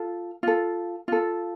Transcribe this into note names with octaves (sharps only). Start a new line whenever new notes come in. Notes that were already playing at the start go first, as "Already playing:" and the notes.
Already playing: F4 A4
F4 A4
F4 A4